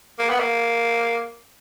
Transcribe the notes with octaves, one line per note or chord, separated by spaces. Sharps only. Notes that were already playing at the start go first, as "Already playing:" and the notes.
A#3
B3
A#3